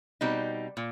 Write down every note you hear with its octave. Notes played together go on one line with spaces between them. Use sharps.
B2 G3 C4 D#4
A#2